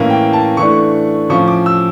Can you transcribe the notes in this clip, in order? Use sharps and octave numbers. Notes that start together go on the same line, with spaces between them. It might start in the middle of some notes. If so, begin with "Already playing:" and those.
Already playing: A2 E3 A#3 C#4
G5
A5
E3 A3 D4 C#6
A2 F3 C#4 C#6
D6
E6